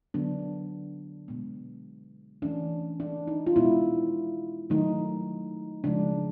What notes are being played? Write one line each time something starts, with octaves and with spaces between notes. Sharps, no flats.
D3 F#3 B3 D4
B2 G#3 B3
E3 A3 C#4 D4
D4
D#4
F4
B2 G#3 B3 E4
D#3 F#3 A3 D#4
C#3 F3 G#3 D4